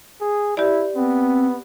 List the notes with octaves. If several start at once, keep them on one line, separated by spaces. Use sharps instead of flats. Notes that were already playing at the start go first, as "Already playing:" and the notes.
G#4
E4 G4 D5
B3 C4